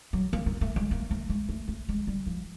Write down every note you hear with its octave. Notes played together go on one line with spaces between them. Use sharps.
F#3
A#3
A#3
A3
G#3
A#3
A3
G#3
A3
A3
G#3
G3
F3